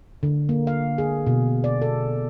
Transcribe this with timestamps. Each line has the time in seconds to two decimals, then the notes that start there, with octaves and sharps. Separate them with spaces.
0.23 D3
0.49 A#3
0.67 F5
0.98 G#4
1.27 B2
1.64 D5
1.82 A4